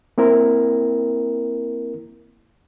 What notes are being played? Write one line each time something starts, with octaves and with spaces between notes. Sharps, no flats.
A#3 C4 E4 A#4